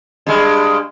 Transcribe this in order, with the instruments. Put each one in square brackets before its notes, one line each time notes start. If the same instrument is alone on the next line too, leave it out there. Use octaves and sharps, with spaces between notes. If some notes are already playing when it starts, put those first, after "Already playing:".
[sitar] G2 G#3